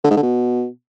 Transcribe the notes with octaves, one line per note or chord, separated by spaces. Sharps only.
D3
G#2
D3
B2